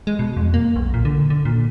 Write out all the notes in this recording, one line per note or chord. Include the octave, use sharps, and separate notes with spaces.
G#3
B2
F2
A#3
B1
A#2
D3
D3
A#2